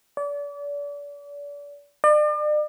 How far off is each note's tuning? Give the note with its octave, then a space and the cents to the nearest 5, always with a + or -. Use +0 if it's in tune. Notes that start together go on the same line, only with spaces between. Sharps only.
D5 -35
D5 +40